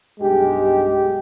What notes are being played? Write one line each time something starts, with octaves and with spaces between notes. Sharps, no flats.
B1 G2 G#3 G4